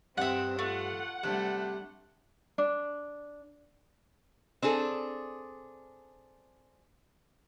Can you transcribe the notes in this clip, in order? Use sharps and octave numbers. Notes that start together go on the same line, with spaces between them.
G2 C4 E5 F#5 D#6
A3 F4 F#5
C3 G3 A3 D4
D4
C4 D4 G#4 A4